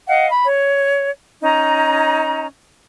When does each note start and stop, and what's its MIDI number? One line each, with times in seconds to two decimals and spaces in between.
0.07 0.29 75
0.07 0.29 77
0.07 0.29 78
0.29 0.45 83
0.46 1.09 73
1.42 2.46 61
1.42 2.46 63
1.42 2.46 82